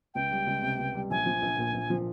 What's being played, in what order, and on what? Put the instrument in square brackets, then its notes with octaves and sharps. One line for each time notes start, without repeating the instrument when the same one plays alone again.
[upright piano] C#2 [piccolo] G5
[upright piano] G3
C#2
C3
C#2
G3
[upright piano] A#1 [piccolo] G#5
[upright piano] F3
A#1
A#2
A#1
F3